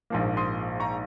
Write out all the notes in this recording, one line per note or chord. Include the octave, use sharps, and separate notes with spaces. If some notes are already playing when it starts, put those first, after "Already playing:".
A#1 G#2 F3 A#3
C6 D#6
A#5 C#6